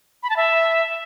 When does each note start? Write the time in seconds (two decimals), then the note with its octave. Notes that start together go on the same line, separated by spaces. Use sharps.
0.23 B5
0.30 A5
0.37 E5